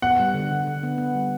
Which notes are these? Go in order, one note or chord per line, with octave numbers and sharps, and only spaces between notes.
B3 F#5
G3
D3
D3
D3
B3
B3
G3